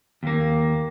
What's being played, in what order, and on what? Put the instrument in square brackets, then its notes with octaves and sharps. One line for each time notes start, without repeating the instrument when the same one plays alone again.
[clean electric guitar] D#2 A#3